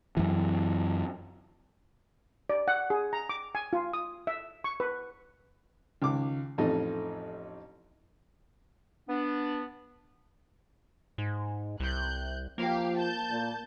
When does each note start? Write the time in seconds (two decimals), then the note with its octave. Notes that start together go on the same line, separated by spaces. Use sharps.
0.17 F#2 E3
2.50 D5
2.68 F#5
2.90 G#4
3.13 A#5
3.29 D6
3.55 G#5
3.73 F4
3.93 D#6
4.27 E5
4.64 C#6
4.80 B4
6.02 C#2 D#3 D6
6.58 A1 F2 A3 D#4 D#5
9.08 B3 D4
11.18 G#2
11.80 C2 F#6 G6
12.58 F3 A#3 G4 F5
12.98 A5 G6
13.31 A#2